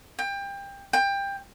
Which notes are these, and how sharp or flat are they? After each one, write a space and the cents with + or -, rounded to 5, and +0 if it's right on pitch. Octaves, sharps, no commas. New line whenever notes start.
G5 +25
G5 +20